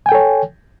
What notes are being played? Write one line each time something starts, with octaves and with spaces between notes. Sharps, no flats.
A4 C#5 G5 G#5